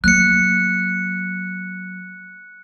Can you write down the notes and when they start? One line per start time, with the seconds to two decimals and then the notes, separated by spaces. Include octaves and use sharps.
0.04 F#3 A#3 F#6 C#7